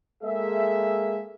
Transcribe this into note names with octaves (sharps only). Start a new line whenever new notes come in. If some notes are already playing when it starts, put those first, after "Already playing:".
G#3 A#3 G#4 A4 E5